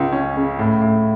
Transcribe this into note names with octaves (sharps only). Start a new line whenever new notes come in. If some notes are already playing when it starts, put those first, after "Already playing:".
Already playing: C#2 C#3
C#4
C#3
A2
A2